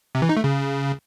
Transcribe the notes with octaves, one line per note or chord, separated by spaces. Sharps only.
C3
E3
D#4
A3
C#3